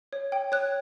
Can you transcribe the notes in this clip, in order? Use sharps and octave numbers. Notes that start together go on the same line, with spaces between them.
C#5
G5
C#5 F#6